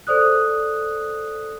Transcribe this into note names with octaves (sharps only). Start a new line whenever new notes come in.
A4 C5 D5 D#6 F#6